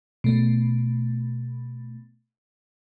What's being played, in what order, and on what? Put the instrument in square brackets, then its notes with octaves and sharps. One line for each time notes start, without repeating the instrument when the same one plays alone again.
[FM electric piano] B2 A3